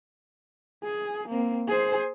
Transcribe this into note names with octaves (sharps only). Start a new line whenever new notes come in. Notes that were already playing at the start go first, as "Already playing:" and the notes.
G#4
A#3 C4
G#4 C5